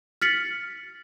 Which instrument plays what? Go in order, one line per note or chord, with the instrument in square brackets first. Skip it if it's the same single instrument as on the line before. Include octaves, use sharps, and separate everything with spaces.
[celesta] F6 A6 B6 C#7 F#7